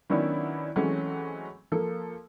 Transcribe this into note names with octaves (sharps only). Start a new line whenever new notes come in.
D#3 F#3 B3 C#4 D4 E4
E3 F#3 G#3 A3 C4 C#4
F3 A#3 A4